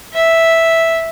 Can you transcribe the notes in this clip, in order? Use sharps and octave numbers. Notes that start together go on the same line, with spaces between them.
E5